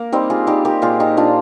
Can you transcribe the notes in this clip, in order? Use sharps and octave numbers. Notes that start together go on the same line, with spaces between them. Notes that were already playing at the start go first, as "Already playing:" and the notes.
Already playing: A#3
G3 C4 D#4
F4 G#4
G3 D#4 G4
G4 A#4
A#2 F4 G#4
D#4 G4
A#2 D4 F4